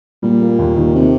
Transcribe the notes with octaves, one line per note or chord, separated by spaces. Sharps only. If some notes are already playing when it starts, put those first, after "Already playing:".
A#2 G3
A#3
D#2
D#3
C3